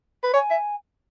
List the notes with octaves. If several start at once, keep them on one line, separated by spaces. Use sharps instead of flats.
B4
C#5 G#5
E5